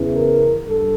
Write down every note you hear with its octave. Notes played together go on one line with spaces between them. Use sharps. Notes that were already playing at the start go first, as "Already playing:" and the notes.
Already playing: E2 C#3 E3
A#4
G2 A4